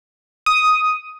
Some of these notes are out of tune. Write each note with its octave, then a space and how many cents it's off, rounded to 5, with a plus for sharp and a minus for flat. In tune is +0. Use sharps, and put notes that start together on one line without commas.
D#6 +5